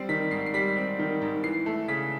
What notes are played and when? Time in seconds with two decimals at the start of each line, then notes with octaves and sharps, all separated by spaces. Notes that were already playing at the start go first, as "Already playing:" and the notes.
Already playing: G3 C4 C7
0.09 D#3 B6
0.31 G#2 C7
0.46 C7
0.54 G3 B6
0.76 C4
0.99 D#3
1.22 G#2
1.43 E3 C7
1.66 A3
1.88 C#3 B6